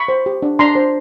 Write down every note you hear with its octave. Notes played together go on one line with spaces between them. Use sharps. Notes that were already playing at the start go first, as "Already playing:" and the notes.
Already playing: B5 C#6
C5
G4
D4
D4 A#5 C6
C5